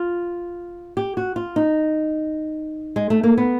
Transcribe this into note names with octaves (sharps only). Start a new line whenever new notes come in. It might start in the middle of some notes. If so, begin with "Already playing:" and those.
Already playing: F4
G4
F#4
F4
D#4
G#3
A3
A#3
B3